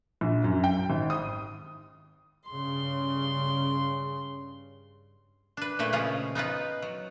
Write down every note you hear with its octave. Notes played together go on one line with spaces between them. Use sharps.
A#1
F#2
G5
G#1
D#6
G2 C#3 C6
D4 B4
A#2 A3 E4 B4
C#3 F3 C#4 F4 G#4 D#5
B3 D#4 F4 B4
F#3